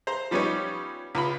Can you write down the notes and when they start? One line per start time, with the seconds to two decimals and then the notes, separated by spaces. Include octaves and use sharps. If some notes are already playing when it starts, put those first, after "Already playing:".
0.07 C5 A#5
0.31 F3 G3 B3 C#4 D#4 C#5
1.15 C#2 F4 B5